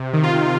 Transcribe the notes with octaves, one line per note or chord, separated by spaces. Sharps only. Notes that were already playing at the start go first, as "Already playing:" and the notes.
Already playing: C3
D#3
F4
C3